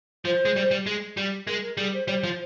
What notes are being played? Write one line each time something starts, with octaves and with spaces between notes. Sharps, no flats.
F3 C5
G#3
G3
G3
G#3
G3
G#3 A#4
A#4
G3 G#4
C5
G3 C#5
C5
F3